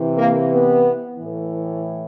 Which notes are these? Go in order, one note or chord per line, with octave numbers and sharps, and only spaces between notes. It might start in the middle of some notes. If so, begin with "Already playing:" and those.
Already playing: C3 E3
A#3
B3
A2 E3